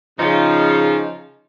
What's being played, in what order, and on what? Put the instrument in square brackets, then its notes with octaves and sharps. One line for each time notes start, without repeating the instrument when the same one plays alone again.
[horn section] C#3 F3 [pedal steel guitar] D#4